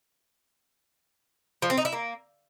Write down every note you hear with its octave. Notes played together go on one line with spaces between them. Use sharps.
F3
C4
D#4
E4
A#3